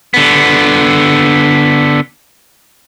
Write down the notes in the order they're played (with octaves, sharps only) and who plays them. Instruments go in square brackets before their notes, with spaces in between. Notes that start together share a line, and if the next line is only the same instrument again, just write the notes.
[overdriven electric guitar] D3 B3